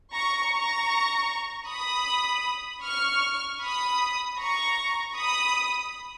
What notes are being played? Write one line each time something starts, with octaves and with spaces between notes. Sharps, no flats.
A#5 C#6
A#5 C#6
B5 D#6
C#6 F6
B5 D#6
A#5 C#6
B5 D#6